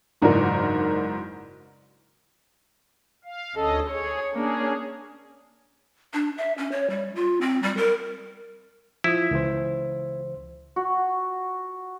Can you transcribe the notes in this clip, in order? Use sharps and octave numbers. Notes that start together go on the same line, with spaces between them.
F#1 G#2 E3 D4 F#4 A#4
F5
D2 C#4 A4 D#5
G#4 C#5
A#3 C#4 D4 G#4
D4
E5
C#4
C#5
G3
F4
C4
G3
A#4
F3 E4 F4 D#6
C#2 E3 C5
F#4